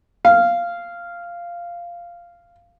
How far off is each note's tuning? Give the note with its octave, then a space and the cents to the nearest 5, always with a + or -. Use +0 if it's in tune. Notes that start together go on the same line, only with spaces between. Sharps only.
F5 -10